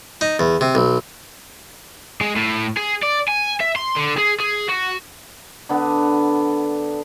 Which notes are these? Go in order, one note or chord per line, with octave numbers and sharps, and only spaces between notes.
D#4
E2
C3
B1
G#3
A2
G#4
D5
G#5
E5
C6
D3
G#4
G#4
F#4
D3 B3